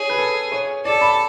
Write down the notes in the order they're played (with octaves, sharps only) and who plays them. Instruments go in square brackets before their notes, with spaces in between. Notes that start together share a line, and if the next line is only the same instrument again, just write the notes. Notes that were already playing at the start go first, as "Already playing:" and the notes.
Already playing: [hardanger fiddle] G#4 [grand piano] C#5
[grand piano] B4
A4
C#5
[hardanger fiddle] A4 [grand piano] D5
[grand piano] B5